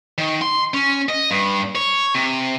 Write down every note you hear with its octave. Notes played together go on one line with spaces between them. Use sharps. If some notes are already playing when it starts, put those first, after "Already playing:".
D#3
C6
C#4
D#5
G2
C#5
C3